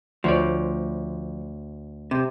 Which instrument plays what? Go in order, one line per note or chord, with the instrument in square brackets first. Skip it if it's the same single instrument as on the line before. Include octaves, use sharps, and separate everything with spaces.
[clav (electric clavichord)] D2 C#5 D5 [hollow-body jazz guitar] F3
[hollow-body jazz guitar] C3